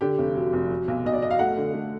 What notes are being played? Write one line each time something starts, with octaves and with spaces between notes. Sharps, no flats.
D3 G4
F1
F#3
F1
F#3
B1
B1 D#5
D5
F#3 D#5
F5
A3 F#5
D3
A3